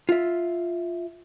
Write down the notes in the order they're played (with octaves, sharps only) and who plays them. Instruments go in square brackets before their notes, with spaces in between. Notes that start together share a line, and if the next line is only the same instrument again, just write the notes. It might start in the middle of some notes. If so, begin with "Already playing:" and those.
[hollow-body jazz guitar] F4 E5